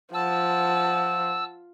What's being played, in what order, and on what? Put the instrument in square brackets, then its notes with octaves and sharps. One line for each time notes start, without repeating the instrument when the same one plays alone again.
[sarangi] F3 [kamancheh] F#5 A5 [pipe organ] E6